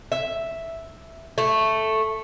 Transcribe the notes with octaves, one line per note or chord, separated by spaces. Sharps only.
E5
A3